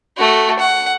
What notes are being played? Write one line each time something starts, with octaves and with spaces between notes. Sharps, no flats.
A3 F#4
F#5